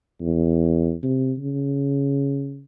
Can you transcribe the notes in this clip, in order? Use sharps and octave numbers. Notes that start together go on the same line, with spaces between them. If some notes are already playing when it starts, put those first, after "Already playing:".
E2
C3
C#3